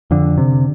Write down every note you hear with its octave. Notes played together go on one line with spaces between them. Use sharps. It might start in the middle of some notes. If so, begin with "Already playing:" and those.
F2 D3
C3